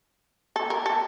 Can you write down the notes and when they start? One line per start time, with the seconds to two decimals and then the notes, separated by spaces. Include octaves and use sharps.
0.56 A4
0.70 A#4
0.86 A4